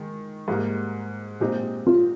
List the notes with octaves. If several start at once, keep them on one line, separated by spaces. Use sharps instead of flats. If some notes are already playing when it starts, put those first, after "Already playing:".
Already playing: D#3 G#3
G#2 G3 A#3
A#2 G#3 C4 D#4 G4
F4